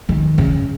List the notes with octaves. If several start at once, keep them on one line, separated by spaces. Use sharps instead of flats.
D#3
C#3